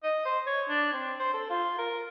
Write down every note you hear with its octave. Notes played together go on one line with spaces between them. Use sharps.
D#5
C5
C#5
D4
C4
C5
A4
F4
A#4